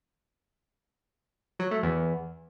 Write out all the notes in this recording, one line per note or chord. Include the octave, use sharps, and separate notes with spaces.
F#3
A3
E2